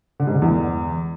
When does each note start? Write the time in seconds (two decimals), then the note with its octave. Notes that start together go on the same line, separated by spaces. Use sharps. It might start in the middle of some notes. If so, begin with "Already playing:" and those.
0.20 D3
0.27 G#2
0.34 D3
0.42 E2